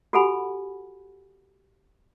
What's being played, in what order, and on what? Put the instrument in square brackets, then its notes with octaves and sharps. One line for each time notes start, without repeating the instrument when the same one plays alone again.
[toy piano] F#4 G4 A4 F#5 G#5 B5